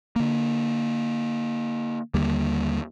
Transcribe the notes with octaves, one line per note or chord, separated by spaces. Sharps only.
D3 A#3
D#2 D3 G3 A#3